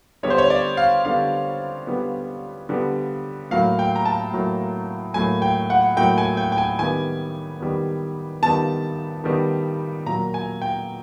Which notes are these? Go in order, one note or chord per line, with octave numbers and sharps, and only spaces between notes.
D3 G3 B3 C#5
C5
C#5
D5
F5
D3 G3 B3 F5
D3 G3 B3
D3 G3 B3
A2 F#3 A#3 F5
G5
A#5
A5
A2 F#3 A#3
A2 F#3 A#3 G#5
G5
F#5
A2 F#3 A#3 G5
G#5
G5
G5
G#5
D#3 G3 B3 G#5
D#3 G3 B3
D#3 G3 B3 A5
D#3 G3 B3
A#2 F#3 A#3 A#5
G#5
G5